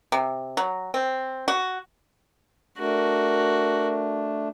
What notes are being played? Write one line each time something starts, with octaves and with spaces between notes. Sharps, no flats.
C3
F#3
C4
F#4
A3 D4 F#4 A#4